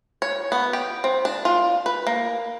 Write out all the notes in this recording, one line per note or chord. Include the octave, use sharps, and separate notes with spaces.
C#5
B3
G4
C4
D4
F4
B4
A#3